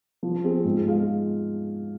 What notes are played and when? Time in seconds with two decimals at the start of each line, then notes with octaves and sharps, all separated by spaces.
0.23 F3
0.44 C4 G#4
0.64 G#2
0.86 G#3 F4 G#4 F5